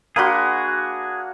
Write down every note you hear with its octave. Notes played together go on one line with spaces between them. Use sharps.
A#3 D4 F#4 G#4 B5 C6